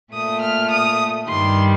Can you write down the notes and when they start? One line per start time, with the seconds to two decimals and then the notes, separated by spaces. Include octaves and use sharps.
0.13 A#2 A3 D#6
0.42 F6
0.71 D#6
1.28 G2 D#3 G3 C6